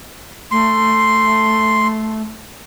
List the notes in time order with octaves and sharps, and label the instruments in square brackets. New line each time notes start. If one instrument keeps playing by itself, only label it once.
[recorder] A3 [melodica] C6